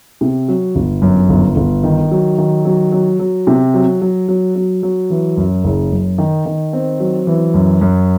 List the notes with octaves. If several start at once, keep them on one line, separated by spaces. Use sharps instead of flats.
C3
F#3
G1
F#2
G1
G1
D#3
F#3
D#3
F#3
F#3
F#3
C3
F#3
F#3
F#3
F#3
F#3
E3
F#2
F#1
F#2
D#3
D#3
C4
F#3
E3
F#2
F#2